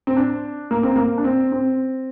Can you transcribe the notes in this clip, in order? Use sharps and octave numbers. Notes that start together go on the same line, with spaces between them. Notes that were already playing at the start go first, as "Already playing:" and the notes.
C4
D4
A#3
C4
A#3
D4
C4
C4